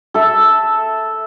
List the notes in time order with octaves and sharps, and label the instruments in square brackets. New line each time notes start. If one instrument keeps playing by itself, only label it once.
[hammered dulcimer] A4 E5